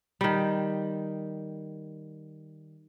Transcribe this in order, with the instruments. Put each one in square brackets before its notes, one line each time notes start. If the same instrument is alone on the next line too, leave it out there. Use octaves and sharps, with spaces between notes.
[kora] D#3 G3